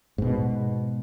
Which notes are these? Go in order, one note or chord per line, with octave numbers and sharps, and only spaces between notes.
G#2 B2